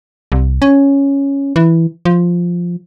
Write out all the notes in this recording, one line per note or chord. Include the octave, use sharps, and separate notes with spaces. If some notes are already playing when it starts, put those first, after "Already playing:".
C2
C#4
E3
F3